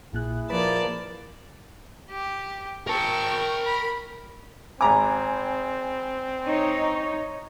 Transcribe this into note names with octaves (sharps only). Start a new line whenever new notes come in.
A#1 A#2 E4 G#4 F#6
F3 A#3 B4 D5 A5 B5
G4
A#4 G5 A5 C#6
B5
G#1 C4 G#5 A#5 D6
D#4 C#5